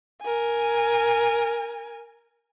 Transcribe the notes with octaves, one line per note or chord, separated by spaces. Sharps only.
A#4 G#5